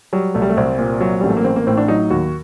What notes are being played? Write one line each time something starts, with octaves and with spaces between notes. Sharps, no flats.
F#3 G3
C2 A3
G3
A3
C2 C4
A#2
F#3
A1 G3
A3
A#3
A1 C4
A#3
A2 C4
D4
F#3 D#4
D#2 F#4